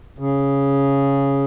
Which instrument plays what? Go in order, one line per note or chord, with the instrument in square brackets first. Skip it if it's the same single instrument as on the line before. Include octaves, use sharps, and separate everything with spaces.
[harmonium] C#3